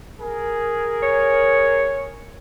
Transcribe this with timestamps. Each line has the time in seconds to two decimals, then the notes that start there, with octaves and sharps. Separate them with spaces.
0.20 G#4 A#4
1.02 C#5